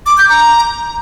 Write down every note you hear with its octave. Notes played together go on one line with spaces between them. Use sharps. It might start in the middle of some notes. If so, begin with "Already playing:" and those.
D6
G6
A#5